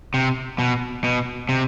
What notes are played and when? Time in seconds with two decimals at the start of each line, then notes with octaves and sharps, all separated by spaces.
0.14 C3
0.59 B2
1.04 B2
1.49 C3